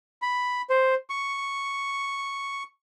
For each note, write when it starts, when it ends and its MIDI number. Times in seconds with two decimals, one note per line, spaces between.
0.22 0.62 83
0.70 0.94 72
1.10 2.63 85